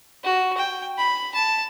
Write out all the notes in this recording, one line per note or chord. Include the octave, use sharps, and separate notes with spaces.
F#4
G5
B5
A5